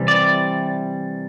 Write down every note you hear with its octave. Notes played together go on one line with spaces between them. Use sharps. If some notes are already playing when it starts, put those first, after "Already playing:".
Already playing: C3 E3 G3
D5